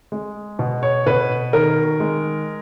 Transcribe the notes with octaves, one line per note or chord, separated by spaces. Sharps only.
G#3
B2
C#5
B2 B4
D#3 A#4
G#3